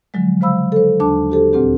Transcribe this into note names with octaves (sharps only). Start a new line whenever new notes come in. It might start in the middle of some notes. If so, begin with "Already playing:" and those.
D3 F3 F#3 G#3
C#3 G#3 C5 F5 B5 E6
A4 C5
D#2 D4 A5 D6
F#4 G4 A4 C5
D2 A#2 C4 G4